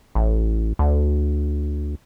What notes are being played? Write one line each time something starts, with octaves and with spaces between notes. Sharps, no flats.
A1
D2